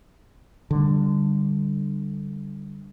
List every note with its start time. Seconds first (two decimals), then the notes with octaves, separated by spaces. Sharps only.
0.71 D3 G3